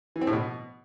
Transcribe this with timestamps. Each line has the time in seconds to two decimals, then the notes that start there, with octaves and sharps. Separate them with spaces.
0.16 E3
0.21 C4
0.27 A2
0.33 B2